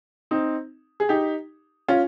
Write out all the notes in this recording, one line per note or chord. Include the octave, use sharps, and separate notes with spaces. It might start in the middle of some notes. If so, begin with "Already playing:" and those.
C4 D#4
G#4
D#4 G4
C#4 F4